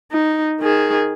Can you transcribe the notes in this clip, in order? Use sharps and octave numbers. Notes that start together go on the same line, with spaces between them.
D#4
D#3 G#4